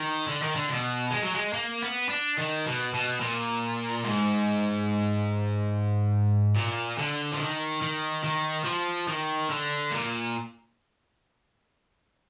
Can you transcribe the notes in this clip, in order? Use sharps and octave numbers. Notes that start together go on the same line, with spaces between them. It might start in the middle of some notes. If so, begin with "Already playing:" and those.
Already playing: D#3
D3
D#3
D3
B2
G#3
F#3
G#3
A#3
B3
D4
D#3
B2
B2
A#2
G#2
A#2
D3
F3
D#3
D#3
D#3
F3
D#3
D3
A#2